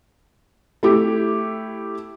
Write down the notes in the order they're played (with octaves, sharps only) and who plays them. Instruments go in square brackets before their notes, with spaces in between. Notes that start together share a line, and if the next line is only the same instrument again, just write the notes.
[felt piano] A3 E4 G4